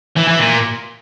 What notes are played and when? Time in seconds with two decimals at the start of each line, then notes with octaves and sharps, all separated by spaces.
0.17 E3
0.28 E3
0.40 A#2